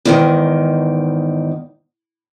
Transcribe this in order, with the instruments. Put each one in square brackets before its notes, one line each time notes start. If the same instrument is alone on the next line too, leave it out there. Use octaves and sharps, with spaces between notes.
[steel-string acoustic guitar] E2 G#2 D#3